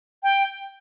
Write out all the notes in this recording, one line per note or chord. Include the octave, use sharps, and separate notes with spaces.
G5